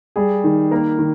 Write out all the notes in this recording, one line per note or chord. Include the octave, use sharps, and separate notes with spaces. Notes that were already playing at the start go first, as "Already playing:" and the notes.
G3 G#4
D#3
A#3 A#4
D#3